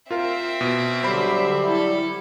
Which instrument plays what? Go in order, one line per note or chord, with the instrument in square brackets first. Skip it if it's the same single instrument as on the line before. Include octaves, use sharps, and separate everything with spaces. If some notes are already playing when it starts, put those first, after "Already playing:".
[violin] C4 E5 [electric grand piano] F4 A#4 F5
[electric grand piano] B2
[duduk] D3 [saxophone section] F#3 G3 [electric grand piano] C5 B5
[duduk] E4 [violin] A4